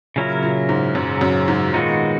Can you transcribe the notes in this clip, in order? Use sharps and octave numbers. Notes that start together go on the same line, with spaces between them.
A#2 C#3 F#3 C#4 E4 A#4
A#2
G#2
F#2 C#3 F#3 C#4
F#2
G#2
A#2 D#3 G#3 B3 D#4 F#4